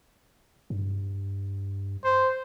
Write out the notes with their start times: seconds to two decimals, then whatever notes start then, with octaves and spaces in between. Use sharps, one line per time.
0.70 G2
2.04 C5